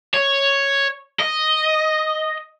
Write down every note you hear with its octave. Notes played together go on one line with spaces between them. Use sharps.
C#5
D#5